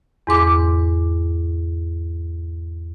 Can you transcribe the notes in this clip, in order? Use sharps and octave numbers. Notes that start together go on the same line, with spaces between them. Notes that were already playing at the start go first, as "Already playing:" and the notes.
E2 G#2 D6